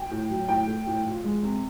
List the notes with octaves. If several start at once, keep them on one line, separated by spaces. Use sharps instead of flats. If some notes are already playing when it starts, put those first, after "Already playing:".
Already playing: G5
A2
F#3
A2 G5
A3
A2
F3
G#3
C3